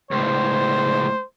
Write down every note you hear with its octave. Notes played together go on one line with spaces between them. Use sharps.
C#2 A2 C5